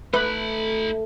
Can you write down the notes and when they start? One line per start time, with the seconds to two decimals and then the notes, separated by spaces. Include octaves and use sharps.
0.14 A3 D#4 B4 B5